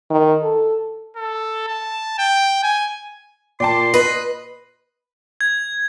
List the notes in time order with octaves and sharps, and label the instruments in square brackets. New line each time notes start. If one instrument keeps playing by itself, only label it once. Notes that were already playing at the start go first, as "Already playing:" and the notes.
[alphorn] D#3
A4
[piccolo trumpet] A4
A5
G5
G#5
[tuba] A#2 [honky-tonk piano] D5 G5 A5 [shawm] C6
[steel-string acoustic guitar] B4 [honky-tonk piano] D#5
[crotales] G#6